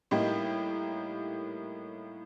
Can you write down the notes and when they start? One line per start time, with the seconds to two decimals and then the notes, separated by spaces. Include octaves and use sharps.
0.11 A2 G3 A#3 D#4 G4